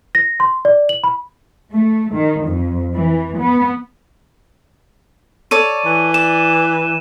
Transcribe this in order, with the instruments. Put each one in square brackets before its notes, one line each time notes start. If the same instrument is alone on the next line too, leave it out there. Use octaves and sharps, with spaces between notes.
[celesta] A#6
C6
D5
F#7
B5
[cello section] A3
D#3
F2
E3
B3
[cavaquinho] A4 C#5 D5 [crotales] D#7
[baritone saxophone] E3
[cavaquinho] D5 [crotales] E7